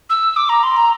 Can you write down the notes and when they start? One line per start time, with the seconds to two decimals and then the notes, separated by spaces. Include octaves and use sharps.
0.10 E6
0.37 D6
0.49 A#5
0.63 C6
0.77 A#5